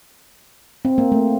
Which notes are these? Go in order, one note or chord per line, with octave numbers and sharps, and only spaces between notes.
C4
A#3
A3